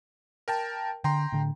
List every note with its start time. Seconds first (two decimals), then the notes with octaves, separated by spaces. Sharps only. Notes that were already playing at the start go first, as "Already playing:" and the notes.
0.48 A#4 G5 A5
1.04 D3 G5 A#5 C6
1.32 A2 D3